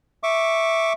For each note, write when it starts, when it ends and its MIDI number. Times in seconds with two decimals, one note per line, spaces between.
0.23 0.93 76
0.23 0.93 85
0.23 0.93 86